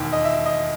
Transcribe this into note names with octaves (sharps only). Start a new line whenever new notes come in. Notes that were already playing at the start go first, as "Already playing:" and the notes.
Already playing: E1 D#2 D#3
D#5
E5
D#5